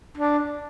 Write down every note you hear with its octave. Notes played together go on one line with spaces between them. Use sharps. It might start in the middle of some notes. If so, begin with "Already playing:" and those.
D4